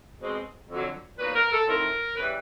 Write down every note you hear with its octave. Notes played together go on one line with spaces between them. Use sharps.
B2 G#3 C4
F2 D3 F#3
A#2 F#3 A#3 D#4 B4
A#4
A4
A2 F3 A3 C4 D#4 A#4
C#3 E3 G3 B4